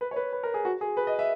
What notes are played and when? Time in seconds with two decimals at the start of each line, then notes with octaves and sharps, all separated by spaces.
0.01 B4
0.11 C#5
0.16 B4
0.33 B4
0.43 A#4
0.54 G#4
0.65 F#4
0.81 G#4
0.97 B4
1.07 D#5
1.19 E5